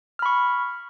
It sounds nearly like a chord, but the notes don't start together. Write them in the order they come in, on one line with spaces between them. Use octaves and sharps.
F6 B5 C#6